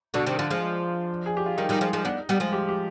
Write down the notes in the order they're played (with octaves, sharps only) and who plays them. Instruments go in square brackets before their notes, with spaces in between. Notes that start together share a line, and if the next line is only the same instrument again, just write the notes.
[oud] B2 D3 [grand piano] D4
[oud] C3 D#3
D3 F3
F3 G#3
[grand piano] G#4
G4
F4
[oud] D#3 G3 [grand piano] D#4
[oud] D#3 G3
F3 G#3
F3 G#3
B3 D4
G3 B3
F3 G#3
[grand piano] G4
G4